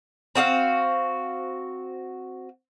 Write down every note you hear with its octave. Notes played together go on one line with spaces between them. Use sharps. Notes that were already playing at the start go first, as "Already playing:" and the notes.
C4 F#4 G#4 F5